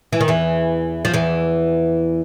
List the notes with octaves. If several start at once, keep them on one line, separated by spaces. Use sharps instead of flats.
E3
D#3
E2 E3
F3
E2 E3